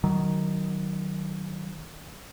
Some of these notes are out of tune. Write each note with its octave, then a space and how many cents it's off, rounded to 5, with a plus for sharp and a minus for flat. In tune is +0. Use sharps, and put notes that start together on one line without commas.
D#3 +0 F#3 +15